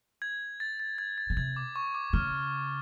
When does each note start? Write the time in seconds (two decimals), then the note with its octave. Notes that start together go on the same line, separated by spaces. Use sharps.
0.22 G#6
0.60 A6
0.80 A6
0.98 G#6
1.18 A6
1.30 B2
1.36 C3 G#6
1.56 D6
1.76 C#6
1.95 D6
2.13 C#3 F6